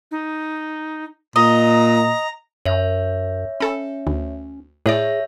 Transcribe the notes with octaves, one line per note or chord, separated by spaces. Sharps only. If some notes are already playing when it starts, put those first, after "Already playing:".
D#4
A#2 D#5 A#5
F#2 C#5 E5
C#4 A4 B5
D2
A2 G#4 C#5 D5 E5 A#6